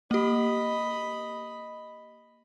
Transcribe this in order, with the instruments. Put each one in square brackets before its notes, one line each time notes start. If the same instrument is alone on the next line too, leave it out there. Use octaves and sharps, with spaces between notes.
[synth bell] A#3 G4 [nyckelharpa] D#5 B5